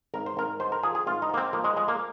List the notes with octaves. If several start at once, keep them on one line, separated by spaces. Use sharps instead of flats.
G#1 A#4
C5
G#1 A#4
G#2 C5
A#4
F3 G#4
G#4
G#1 F4
D#4
G#2 A#3
C4
F3 A#3
G#3
F3 G#3
A#3